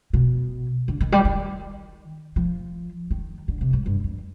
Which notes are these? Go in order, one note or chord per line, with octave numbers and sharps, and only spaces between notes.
B2
D3
D#3
G3
D#3
F3
D#3
D3
C3
G#2
G2
F2